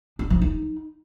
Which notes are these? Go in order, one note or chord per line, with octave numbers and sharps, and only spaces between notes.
D4
F3
D#4